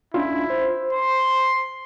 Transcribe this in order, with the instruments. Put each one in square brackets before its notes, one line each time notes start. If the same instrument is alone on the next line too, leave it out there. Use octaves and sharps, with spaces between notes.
[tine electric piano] C#4 D4 F4 [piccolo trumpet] E4
[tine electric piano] C5
[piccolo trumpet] C6